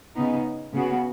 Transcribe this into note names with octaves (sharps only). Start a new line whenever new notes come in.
C#3 B3 D#4
C#3 B3 F#4